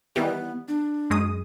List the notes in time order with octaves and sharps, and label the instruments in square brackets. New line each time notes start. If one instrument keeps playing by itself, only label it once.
[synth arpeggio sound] D#3 E3 G3 [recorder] B3
[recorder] D4
[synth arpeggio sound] F#2 G#3 D#6